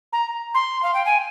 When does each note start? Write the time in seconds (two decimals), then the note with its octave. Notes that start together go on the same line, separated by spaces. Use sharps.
0.13 A#5
0.54 C6
0.83 F5
0.94 G5
1.06 G#5